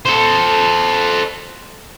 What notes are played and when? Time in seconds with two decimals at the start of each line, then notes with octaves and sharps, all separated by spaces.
0.05 A4 C5